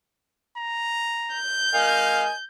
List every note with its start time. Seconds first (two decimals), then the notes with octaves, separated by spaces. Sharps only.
0.57 A#5
1.35 G6
1.74 A#4 D#5 F5 G#5